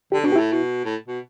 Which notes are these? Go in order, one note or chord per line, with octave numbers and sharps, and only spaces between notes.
D3 G4
B2 D4
G4
A2 E4
B2
A2
B2